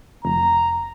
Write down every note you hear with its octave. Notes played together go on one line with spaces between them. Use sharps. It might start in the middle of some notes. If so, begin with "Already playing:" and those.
F1 A#5